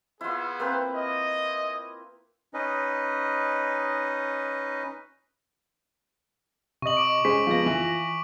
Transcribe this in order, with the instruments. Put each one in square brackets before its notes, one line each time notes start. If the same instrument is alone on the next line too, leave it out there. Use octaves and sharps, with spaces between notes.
[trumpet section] B3 G#4 C5 [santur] E4 F4
[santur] A#3 C4 B4
[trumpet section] D#5
[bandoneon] C#4 D#4 B4 D#5
[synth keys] C3 D#5 [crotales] C#6 F#7
[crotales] C#6 D6 D7
[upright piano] G#3 C#4 [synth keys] G#4 C5 [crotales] B6
[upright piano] F3 G#3 B3 [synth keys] F4 A#6
[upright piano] E3